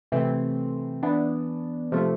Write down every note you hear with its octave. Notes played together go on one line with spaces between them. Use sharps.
C3 E3 A3 C4
E3 B3 D4
C3 F3 A3